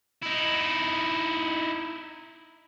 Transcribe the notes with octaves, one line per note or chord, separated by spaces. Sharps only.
D#4 E4